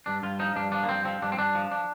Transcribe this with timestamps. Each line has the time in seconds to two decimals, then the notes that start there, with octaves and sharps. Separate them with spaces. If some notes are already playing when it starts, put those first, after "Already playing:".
0.06 G2 D4
0.23 G2 F4
0.39 F3 D#4
0.56 G2 D4
0.72 F3 D4
0.83 A#3
0.89 G2 C4
1.05 F3 C4
1.22 G2 D4
1.32 C4
1.38 G2 D4
1.55 F3
1.72 D4